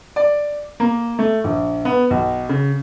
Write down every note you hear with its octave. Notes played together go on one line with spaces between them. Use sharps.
D5
A#3
A3
A#1
B3
B1
C#3